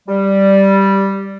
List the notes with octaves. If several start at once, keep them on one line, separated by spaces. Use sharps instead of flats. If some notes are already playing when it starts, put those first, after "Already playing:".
G3